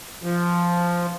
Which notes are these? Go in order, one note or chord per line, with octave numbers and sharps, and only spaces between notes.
F3